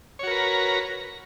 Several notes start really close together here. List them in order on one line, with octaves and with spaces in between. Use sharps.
C#5 F#4 A#4 B4 A#5